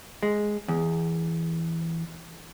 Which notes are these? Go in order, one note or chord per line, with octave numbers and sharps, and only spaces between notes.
G#3
E2